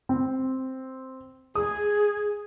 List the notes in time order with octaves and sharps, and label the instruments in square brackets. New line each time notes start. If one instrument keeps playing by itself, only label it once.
[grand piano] C4
[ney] G#4 [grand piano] D#6